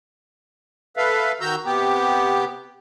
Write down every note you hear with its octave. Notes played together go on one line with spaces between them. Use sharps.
A4 B4 E5 F5
D#3 F#4 A#5 E6 G6
C3 B3 G4